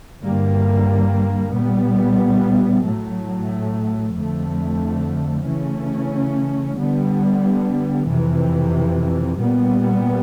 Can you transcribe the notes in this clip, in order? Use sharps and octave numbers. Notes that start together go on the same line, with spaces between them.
G2 D3 G3 A#3
A#2 G3 B3
A2 F#3 A3
F2 D3 F3 A3
C#3 E3 A3 C#4
D3 G3 B3
F2 C3 E3
A#2 G3 B3